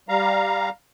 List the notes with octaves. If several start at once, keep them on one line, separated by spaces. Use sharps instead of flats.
G3 F5 A#5